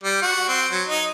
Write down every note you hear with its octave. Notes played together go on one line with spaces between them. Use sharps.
G3
F#4
C4
F#3
D#4